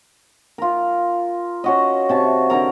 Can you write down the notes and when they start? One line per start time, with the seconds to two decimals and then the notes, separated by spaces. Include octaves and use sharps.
0.58 F4 A#4
1.64 C#4 F#4 D#5
2.09 C3 A5 C#6
2.50 D3 A4 A#4 A#5